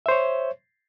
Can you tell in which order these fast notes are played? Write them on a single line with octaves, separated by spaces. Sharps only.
E5 C5 C#5